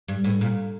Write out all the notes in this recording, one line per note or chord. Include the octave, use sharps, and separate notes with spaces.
G2
A2
A#2